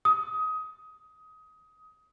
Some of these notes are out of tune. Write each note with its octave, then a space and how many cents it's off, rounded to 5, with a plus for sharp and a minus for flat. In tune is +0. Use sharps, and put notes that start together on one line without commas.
D#6 +20